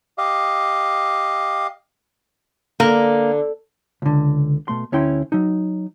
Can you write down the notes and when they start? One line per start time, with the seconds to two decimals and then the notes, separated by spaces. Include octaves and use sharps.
0.18 G4 D#5 F5
2.80 D3 A#3
4.02 C#2 D3
4.68 B2 A3 C6
4.92 D2 C#4 E4 G5 C6
5.32 F#3 D#4